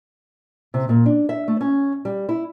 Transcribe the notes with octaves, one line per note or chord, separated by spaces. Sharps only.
C3
A#2
D4
E5
A3
C#4
G3
E4